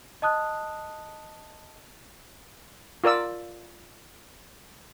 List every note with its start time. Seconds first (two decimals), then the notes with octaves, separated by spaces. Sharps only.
0.22 D#5 A5 D#6 F#6
3.04 F4 A#4 D5 E6